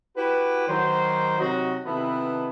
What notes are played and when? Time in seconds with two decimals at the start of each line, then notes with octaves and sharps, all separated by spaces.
0.17 E4 F#4 G4 B4
0.68 D#3 F#3 C5
1.39 C3 F#3 D#4 F#4
1.86 C3 D#3 B3 E4 A4 B4